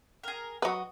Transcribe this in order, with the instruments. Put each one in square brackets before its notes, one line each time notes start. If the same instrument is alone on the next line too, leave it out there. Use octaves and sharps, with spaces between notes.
[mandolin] G#4 A#4
[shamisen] F#3 B4 [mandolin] F#4 D#5